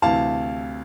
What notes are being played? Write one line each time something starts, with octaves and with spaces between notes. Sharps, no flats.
D2 C3 E3 F5 A5